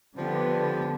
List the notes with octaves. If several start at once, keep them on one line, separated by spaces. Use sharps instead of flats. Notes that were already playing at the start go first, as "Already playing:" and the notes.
D3 F3 G3 B3